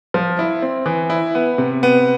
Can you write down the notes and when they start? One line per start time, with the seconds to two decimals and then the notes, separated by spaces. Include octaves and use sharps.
0.14 F3
0.39 E4
0.62 C4
0.86 E3
1.10 E4
1.35 B3
1.58 C3
1.83 B3